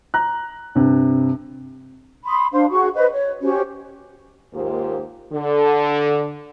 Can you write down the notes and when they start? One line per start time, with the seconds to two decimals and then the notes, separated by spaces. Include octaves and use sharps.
0.14 A#5 F#6
0.75 G2 C3
2.26 B5 C6 D#6
2.53 D4 C5 F5 C6
2.71 F#4 G#4 C#6
2.95 B4 C5 D#5
3.11 C#5
3.42 C#4 F#4 G4 C5
4.54 D#2 G#2 A#3 F4 G4 C5
5.31 D3